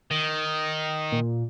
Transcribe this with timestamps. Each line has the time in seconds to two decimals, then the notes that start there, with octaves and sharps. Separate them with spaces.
0.11 D#3
1.12 A#2